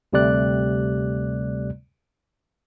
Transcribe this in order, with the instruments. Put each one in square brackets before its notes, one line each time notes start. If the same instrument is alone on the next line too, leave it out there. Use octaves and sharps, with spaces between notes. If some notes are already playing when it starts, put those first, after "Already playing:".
[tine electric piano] D2 C3 G3 A3 D5 F#6